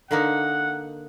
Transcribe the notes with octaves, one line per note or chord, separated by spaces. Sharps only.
D3 A#3 D#4 F#5